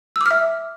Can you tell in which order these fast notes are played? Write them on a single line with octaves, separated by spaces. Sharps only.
E6 D6 F6 E5